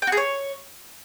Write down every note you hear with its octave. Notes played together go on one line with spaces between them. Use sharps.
G5
F#4
G#4
C#5